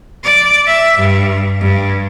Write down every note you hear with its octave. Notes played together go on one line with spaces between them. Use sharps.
D5
E5
G2
G2